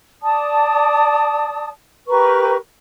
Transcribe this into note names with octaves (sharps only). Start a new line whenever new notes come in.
D5 A5 D#6
G4 A#4 B4 C#6